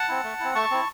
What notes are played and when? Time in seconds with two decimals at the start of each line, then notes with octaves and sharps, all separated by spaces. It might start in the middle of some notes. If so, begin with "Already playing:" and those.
Already playing: F#5 A5
0.09 C4 E4
0.24 A3
0.40 C4 E4
0.55 A3 A5 C#6
0.71 C4 E4